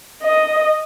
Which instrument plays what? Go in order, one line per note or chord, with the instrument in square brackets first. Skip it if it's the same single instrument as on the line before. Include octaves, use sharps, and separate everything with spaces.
[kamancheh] D#5